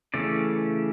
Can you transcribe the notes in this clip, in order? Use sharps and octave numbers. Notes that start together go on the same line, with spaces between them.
C#3 E3 A3 C#4 D5